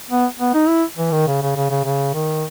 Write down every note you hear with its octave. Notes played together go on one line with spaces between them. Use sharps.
B3
B3
D#4
E4
E3
D#3
C#3
C#3
C#3
C#3
C#3
D#3